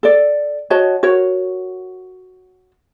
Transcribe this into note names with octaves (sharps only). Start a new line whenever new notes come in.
A4 D5
F#4 C#5 D#5 A5
F#4 A#4 C#5